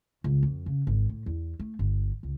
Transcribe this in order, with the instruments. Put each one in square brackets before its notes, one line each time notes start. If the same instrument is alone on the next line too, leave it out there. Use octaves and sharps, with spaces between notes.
[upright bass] C#2
F2
C#3
G#1
A2
E2
A3
G1
C#2